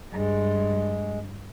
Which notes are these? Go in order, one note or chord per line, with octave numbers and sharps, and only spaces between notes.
G2 G#3